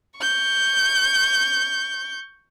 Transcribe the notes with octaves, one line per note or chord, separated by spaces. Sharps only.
C#6 G6